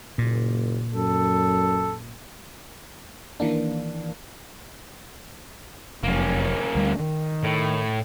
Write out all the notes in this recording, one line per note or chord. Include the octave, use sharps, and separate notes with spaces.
F#1 A#2
F#2 A4
D#3 E3 A#3 D4
F1 F#2 F3 A#3 C#4
D2 G3
D#3
A2